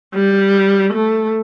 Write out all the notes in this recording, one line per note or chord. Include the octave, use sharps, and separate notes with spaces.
G3
A3